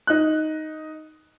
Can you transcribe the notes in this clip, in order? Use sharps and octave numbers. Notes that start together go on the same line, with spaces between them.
D#4 F#6